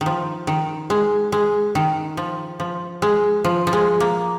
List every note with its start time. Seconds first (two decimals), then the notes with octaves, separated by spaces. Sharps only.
0.01 D#3
0.06 F3
0.47 D#3
0.90 G#3
1.32 G#3
1.75 D#3
2.17 F3
2.60 F3
3.02 G#3
3.44 F3
3.67 F3
3.73 G#3
4.00 A#3